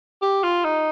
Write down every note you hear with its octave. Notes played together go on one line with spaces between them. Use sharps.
G4
F4
D#4